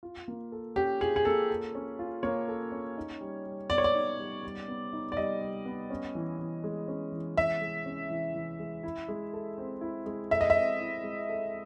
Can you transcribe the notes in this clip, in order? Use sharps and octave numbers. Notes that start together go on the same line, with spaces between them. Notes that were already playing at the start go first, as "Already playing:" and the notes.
F4
A#3
A4
C#4 G4
F4 G#4
G#4
A#3 A4
A4
C#4
F4
A#3 C#5
A4
C#4
D#4
G3
G3
B3 D5
C#5
D5
D#4
G3
G3
B3
D#4
D5
G3 D#5
G3
B3
C#4
E3
E3
G#3
C#4
E3
E3 E5
G#3
C#4
E3
E3
G#3
E4
G#3
A4
C4
E4
G#3
A4 E5
D#5
E5
C4
E4
G#3
A4